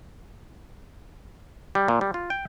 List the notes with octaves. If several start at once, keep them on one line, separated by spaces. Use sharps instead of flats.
G3
A#2
G3
F4
G5